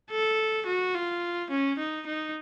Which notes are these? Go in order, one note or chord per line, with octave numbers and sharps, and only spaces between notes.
A4
F#4
F4
C#4
D#4
D#4